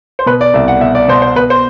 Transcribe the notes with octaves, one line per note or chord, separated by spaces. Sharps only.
C5
B2 B4
D5
C2 E5
F#5
B2 E5
D5
B2 C5
C5
B2 B4
C5